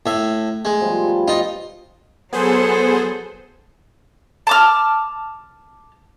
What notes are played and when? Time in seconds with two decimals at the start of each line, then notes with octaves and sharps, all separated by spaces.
0.06 A2 A3 E5
0.65 G#3
0.80 B2 F3 G3
1.05 A5 B5
1.28 D#4 F4
2.33 F#3 B3 G#4 A4 C5
4.47 A5 D6 F6